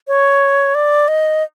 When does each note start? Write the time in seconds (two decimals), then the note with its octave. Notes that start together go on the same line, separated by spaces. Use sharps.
0.08 C#5
0.75 D5
1.08 D#5